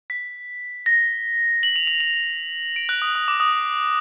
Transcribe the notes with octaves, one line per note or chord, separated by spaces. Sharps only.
B6
A#6
F#7
F7
F7
F7
D7
F#6
D#6
D#6
D6
D#6